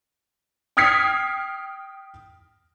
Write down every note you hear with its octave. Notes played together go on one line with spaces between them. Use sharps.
G5 D#6 F6 G#6 B6 C7